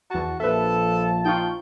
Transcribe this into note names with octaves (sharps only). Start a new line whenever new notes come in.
E2 F#4 A5
A#1 F3 A4 B4 E5 A5
D#4 F4 G5 C#6